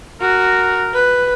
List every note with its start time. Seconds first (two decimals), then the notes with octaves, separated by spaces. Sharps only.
0.21 F#4 A#4
0.94 B4